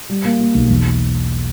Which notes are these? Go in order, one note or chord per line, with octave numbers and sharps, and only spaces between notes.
G3
A#3
A#3
B1
E2